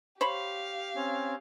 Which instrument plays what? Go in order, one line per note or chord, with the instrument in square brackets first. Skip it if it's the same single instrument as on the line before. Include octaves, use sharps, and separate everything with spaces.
[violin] G4 F5 [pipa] C5 C#5 B5
[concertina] C4 C#4